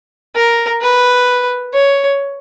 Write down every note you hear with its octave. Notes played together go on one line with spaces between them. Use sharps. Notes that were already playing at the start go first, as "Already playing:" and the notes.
A#4
B4
C#5